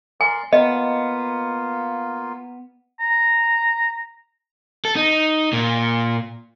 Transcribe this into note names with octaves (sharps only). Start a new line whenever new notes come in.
A#4 D5 G#5 C6
A#3 B3 F4 D#5
A#5
A4
D#4
A#2